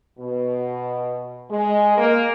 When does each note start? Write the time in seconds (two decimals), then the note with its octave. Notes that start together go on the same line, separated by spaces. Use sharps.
0.19 B2
1.50 G#3
1.97 A#3